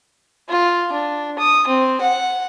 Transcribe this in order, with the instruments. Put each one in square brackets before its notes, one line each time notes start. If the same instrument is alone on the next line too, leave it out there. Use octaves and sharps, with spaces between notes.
[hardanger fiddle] F4
D4
D#6
C4
F#5